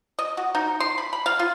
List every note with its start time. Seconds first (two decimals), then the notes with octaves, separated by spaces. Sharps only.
0.19 D#5
0.37 F#4
0.55 D#4
0.80 C6
0.98 B5
1.13 B5
1.26 F5
1.39 F4